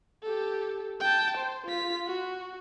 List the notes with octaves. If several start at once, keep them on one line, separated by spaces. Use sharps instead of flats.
G4 A4
G5 A5
C5
F4 B6
F#4